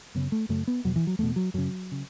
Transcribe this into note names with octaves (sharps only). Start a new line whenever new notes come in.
F#2 C#3 B3
A3
F#2 C#3 A3
B3
E2 B2 F#3
E3
F#3
E2 B2 A3
F#3
F#2 C#3 F#3
C#3